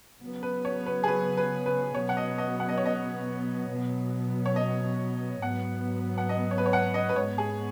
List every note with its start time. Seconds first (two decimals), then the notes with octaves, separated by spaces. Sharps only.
0.21 C#3 F#3 B3
0.43 B4
0.65 C#5
0.86 B4
1.03 G#4
1.08 B4
1.37 B4
1.66 B4
1.94 B2 F#3 B3 C#5
2.09 F#5
2.17 D#5
2.38 D#5
2.60 F#5
2.69 D#5
2.78 C#5
2.86 D#5
3.69 B2 F#3 B3
4.46 C#5
4.56 D#5
5.42 G#2 F#3 B3 F#5
6.18 F#5
6.29 D#5
6.51 C#5
6.58 B4
6.66 C#5
6.73 F#5
6.94 D#5
7.09 B4
7.16 G#2 G#3 B3 C#5
7.38 G#4